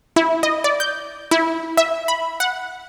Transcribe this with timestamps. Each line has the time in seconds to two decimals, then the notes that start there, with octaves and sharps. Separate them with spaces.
0.16 E4
0.43 D#5
0.64 D5
0.80 G6
1.31 E4
1.77 E5
2.08 B5
2.40 F#5